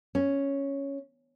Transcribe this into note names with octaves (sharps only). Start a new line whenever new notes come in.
C#4